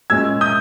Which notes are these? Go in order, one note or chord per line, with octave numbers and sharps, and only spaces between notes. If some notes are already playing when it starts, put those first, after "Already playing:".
A#2 G#3 C#4 E6 G#6
D#6 G6